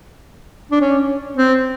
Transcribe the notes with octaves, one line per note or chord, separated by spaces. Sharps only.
D4
C#4
C4